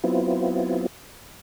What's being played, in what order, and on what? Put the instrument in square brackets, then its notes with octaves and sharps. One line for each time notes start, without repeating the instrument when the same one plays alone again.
[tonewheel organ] F#3 B3 C4 E4 F4